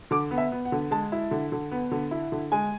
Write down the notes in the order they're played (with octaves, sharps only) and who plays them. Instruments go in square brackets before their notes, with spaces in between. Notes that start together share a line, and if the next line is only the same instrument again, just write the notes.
[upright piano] D3 D6
B3
E5
B3
F#5
D3
G#3 A5
E4
D3
D3
B3
D3
E4
D3
G#3 G#5